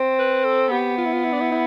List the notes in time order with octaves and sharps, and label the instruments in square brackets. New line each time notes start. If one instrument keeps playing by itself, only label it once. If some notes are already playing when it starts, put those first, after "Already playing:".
Already playing: [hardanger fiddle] C4
[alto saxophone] B4
A4
[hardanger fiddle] B3 [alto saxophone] G4
[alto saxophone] F4
E4
F4
E4
D4
E4
E4